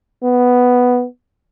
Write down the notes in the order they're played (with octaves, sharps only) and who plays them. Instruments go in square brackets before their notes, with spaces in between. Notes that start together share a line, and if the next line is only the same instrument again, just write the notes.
[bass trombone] B3